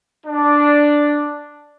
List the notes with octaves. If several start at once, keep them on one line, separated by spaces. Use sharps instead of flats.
D4